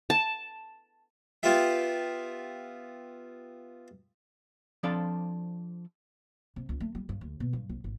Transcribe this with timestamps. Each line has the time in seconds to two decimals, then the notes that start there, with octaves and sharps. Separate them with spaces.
0.10 A5
1.43 B3 F4 G4 E5
4.83 F3 C4 D4 A4 D5 F5
6.56 C3
6.69 C#2
6.80 A3
6.95 G3
7.09 G2
7.21 D2
7.40 B2
7.53 G2
7.69 C2
7.84 G#1